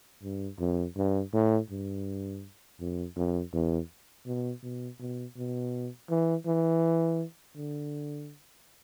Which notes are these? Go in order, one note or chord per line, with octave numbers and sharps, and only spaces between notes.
G2
F2
G2
A2
G2
F2
F2
E2
B2
B2
B2
B2
E3
E3
D3